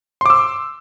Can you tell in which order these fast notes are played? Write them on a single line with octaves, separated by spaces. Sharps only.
C6 D6 E6